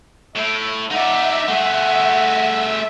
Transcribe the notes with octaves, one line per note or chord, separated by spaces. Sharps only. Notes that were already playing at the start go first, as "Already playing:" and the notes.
A2 E5
D#4 D5 E5 F#5
A3 G#4 F#5